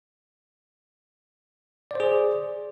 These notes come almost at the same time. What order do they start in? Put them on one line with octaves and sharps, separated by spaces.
D5 C5 G#4